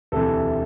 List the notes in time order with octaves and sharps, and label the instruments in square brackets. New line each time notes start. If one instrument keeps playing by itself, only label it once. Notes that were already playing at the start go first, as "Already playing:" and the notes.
[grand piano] E1 D2 C3 E3 A4